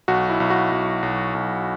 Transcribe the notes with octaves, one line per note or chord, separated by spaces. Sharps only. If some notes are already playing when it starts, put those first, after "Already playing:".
B1 F#4
E4
B1
F#4
B1
B1
B1